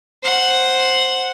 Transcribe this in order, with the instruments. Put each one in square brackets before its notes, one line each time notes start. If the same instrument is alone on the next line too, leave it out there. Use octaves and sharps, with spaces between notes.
[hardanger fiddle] C5 F#5